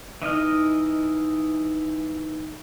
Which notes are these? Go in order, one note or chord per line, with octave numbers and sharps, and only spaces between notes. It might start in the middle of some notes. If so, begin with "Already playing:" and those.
E3 D#4 D#5 F6